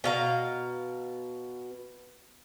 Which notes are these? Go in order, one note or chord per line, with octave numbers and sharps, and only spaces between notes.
B2 F5 A#5